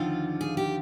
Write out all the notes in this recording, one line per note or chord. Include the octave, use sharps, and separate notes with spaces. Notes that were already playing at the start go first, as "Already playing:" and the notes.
Already playing: D#2 D3 F3 F4
G#4
G4